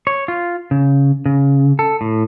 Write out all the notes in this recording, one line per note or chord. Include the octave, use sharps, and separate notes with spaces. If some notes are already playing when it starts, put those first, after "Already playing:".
C#5
F4
C#3
C#3
A4
A2